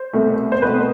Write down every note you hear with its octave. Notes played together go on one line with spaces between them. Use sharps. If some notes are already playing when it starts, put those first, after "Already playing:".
Already playing: C5
C2 B2 A3
C5
C2 B2 A3 B4